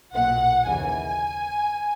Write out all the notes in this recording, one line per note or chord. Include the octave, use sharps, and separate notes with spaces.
B1 A#2 F#5
D#2 C#3 E3 G#5